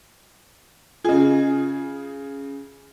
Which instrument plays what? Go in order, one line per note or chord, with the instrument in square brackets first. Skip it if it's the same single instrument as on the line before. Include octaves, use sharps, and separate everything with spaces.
[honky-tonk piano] C#3 G#4 [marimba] F4 D#5